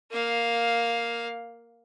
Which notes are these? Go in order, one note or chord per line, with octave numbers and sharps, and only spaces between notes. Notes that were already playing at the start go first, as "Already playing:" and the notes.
A#3 F5